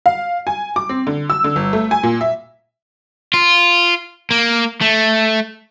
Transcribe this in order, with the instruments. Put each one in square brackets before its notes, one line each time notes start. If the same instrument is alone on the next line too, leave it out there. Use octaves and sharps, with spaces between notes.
[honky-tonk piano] F5
G#5
D6
C4
D3
E6
D3
G1
A3
G#5
A#2
E5
[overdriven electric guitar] F4
A#3
A3